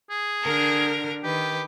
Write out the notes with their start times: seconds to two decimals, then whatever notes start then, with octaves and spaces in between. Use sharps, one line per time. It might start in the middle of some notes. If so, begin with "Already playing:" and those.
0.10 G#4
0.42 D3 A#4 F6
1.23 D#3 G4 B4